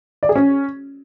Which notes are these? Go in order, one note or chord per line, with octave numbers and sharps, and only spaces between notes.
D5
G#4
C#4